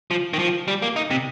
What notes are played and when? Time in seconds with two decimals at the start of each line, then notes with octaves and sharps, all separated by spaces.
0.11 F3
0.34 D#3
0.39 F3
0.68 G3
0.82 A#3
0.96 D#4
1.11 C3